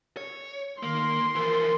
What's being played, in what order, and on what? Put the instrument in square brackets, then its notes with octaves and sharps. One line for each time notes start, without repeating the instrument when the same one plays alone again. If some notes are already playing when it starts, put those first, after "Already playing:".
[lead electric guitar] C#5
[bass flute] D#3 [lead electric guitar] A#3 [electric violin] C6
[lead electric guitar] E3 F3 [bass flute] A#4